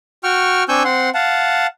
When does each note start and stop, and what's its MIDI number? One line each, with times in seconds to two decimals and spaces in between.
0.24 0.63 66
0.24 0.63 79
0.24 0.63 85
0.24 0.63 89
0.69 0.83 60
0.69 0.83 62
0.69 0.83 80
0.69 0.83 85
0.69 0.83 88
0.69 0.83 91
0.85 1.10 60
0.85 1.10 78
0.85 1.10 84
1.14 1.67 77
1.14 1.67 78
1.14 1.67 81